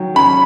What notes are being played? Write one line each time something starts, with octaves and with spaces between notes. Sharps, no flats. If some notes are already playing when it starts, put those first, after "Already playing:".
Already playing: D#3 F#3
C#4 B5